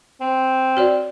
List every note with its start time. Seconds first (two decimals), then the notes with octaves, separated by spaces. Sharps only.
0.21 C4
0.77 F#4 C#5 D5